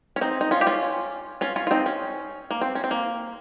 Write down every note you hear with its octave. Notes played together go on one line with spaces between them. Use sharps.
C#4
C4 D#4
D#4
C#4 F4
G4
C#4 F4
C#4 F4
C#4 F4
F4
C4 D#4
C#4
A#3
C4
C#4
C4
A#3